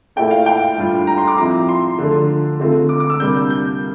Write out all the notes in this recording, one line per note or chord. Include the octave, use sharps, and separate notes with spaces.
A#2 A3 E4 G5
F5
G5
A2 G3 D4 F4
A#5
C6
D6
F3 C4 E4 A#5
C6
D3 F3 A3 D4
D3 A3 C4 F4
D6
D6
E6
C3 G3 A#3 D4 G6
G6